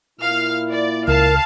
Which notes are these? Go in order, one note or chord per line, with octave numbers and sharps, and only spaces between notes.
A#2 A#3 E4 F5 F6
D5
C#2 A#4 F5 A5